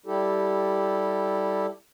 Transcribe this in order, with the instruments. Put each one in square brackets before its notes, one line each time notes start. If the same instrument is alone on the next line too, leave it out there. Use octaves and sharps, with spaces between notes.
[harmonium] G3 E4 G4 A4